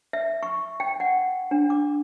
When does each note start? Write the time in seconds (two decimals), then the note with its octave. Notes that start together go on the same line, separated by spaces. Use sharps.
0.13 E5
0.43 C#6
0.80 G5
1.00 F#5
1.51 D4
1.70 D6